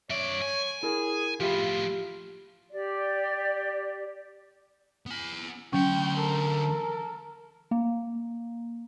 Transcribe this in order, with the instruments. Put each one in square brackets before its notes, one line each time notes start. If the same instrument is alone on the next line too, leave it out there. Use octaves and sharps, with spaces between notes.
[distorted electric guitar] F#2 D5 [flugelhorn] C#5 [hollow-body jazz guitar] E5
[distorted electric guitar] G#5
[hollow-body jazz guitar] E4 A#4 [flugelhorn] G#4
[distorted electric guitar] A2 F3 [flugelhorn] F4 [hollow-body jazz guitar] G4 E5 B5
[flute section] G4 D5
[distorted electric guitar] B3 G#5
[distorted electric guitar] D2 C6 [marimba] F#3 C#4 [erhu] G5
[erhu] A4 [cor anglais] A#4
[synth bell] A#3